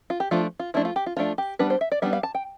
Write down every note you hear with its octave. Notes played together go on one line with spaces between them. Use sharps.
F4
G4
F3 A3 D4 F4
F4
F3 A3 D4 E4
F4
G4
F4
F3 A3 D4 F4
G4
G3 B3 D4 B4
C5
E5
D5
G3 B3 D4 E5
F5
A5
G5